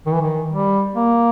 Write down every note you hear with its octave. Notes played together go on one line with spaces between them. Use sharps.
D#3
E3
D#3
G3
A#3